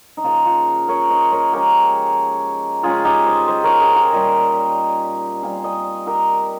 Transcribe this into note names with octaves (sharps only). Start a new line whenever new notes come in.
D#4
C#3 F3 A#3 F4
F4
A#4 C#5
C5 D#5
A#4 C#5
F3 G#3 C#4 G4 A#4
C#3 G#3 C#4 F4 G#4
D#4 G4
C5 D#5
C5 D#5
A#4 C#5
G#4 C5
G4 A#4
A#2 G3 C#4 D#5 G5
A#2 G3 C4 F5 G#5
D#5 G5
G4 A#4